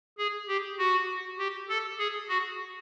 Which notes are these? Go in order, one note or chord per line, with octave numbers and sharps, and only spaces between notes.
G#4
G4
F#4
G4
A4
G#4
F#4